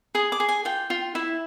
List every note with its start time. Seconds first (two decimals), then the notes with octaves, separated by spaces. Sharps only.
0.15 G#4 D#6
0.32 D6
0.40 G#4
0.49 G#5
0.65 F4 G5
0.90 F4
1.15 E4 E5